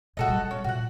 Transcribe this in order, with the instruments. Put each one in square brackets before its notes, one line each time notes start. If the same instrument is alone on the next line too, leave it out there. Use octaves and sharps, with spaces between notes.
[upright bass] A#2 G#3 [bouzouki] F#4 A4 D#5
[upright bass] G3
[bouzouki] C#4
[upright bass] A#2 [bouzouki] F#4 F#5